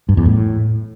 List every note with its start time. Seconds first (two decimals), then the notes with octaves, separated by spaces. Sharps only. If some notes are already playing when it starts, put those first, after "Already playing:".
0.09 G2
0.17 E2
0.26 A2